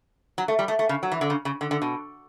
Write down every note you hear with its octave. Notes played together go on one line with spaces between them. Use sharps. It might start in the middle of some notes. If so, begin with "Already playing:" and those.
F#3
A3
G3
A3
A3
C#3
F#3
E3
D3
C#3
C#3
D3
D3
B2